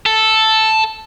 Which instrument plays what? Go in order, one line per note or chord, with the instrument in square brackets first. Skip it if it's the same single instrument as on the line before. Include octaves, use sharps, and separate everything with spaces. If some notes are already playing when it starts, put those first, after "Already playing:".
[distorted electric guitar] A4